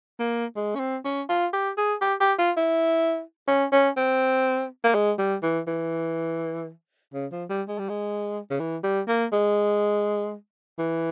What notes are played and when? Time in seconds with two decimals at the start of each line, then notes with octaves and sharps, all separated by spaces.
0.19 A#3
0.56 G#3
0.75 C#4
0.79 C4
1.05 C#4
1.29 F4
1.53 G4
1.77 G#4
2.01 G4
2.20 G4
2.38 F4
2.57 E4
3.48 C#4
3.72 C#4
3.97 C4
4.84 A#3
4.94 G#3
5.18 G3
5.42 E3
5.67 E3
7.13 C#3
7.32 F3
7.49 G3
7.68 G#3
7.79 G3
7.89 G#3
8.50 C#3
8.59 E3
8.83 G3
9.08 A#3
9.32 G#3
10.79 E3